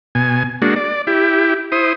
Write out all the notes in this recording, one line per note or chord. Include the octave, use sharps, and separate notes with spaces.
B2 G#5
G#3 A#3 D4 F#4
D5
E4 G4
E4 C5 D#6